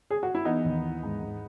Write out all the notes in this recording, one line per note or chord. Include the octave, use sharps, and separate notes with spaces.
G#4
F#4
E4
E3 B3 D#4
D#2
E4
G#2
G#2